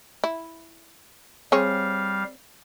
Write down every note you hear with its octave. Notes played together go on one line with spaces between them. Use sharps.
E4
G3 C4 G#4 C#5 F5